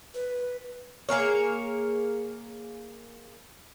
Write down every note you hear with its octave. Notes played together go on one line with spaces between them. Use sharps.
B4
A#3 G#4 A#4 C#5